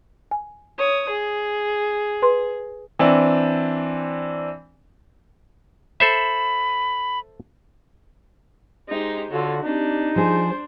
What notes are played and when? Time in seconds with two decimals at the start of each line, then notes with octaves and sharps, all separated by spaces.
0.31 G#5
0.78 C#5 D#6
1.09 G#4
2.22 B4 C6
2.99 E3 C4 D4
6.00 A4 C5 E5 B5
8.88 G#3 D#4 G4 C5
9.31 D3 F4 F#4 A4 C#5
9.63 C4 D4 D#4 G4
10.16 F3 D4 G#4 C5